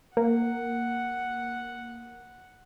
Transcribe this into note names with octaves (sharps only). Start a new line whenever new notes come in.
A#3 F#5